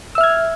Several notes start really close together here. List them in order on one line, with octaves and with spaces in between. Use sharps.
E6 E5 F6 G#6